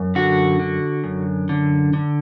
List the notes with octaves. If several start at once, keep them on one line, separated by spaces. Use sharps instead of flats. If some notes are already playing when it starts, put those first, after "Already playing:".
Already playing: F#2
D3 F#4
D3
F#2
D3
D3